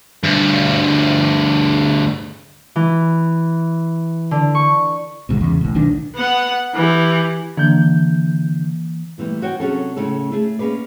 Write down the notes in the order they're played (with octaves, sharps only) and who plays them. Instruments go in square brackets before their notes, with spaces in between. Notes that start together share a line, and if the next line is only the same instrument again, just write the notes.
[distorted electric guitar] D2 G2
[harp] E3
D3
C#6
[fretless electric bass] G#1 D2 G#2 B2
E2 C#3
A#1 A2
B1 D#3 D4
[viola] B3 F#5
E3 G4
[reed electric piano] D3 G6 [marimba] E3 A#3
[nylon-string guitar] A#2 E3 G3 A3
F#4 C#5 G5
C3 F#3 C#4 F#4 G#4 A4
A2 C#3 C#4 A4
A3 G#4
A#3 C#4 G#4 B4 D5